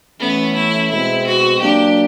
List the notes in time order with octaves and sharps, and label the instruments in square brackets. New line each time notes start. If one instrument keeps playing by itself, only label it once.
[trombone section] E3 A3 C#4 [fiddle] B3
[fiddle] E4
[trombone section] B2 G#3 C4 [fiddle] E4
[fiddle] F#4
[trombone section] F#3 A#3 D4 [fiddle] G4